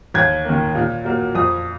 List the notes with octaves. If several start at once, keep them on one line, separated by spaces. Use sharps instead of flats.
D#2 G#6
D#3 A#3
A#2
F#3 A#3
F2 D#6